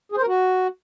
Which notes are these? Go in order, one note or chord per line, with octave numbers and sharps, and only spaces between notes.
G#4
C5
A#4
F#4